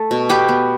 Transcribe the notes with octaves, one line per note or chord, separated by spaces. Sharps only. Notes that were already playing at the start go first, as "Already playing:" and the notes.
Already playing: A3 A4
B2
B3 G4 B4
B3